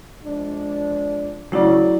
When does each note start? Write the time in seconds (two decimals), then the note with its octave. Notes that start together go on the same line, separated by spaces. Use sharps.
0.24 F3 G#3 D4
1.52 C#3 F#3 A3 E4 D5